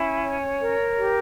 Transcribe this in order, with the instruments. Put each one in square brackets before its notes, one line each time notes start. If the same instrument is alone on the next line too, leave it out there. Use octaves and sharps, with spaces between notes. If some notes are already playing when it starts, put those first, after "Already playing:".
Already playing: [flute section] C#4 E4
C#5
A#4
G4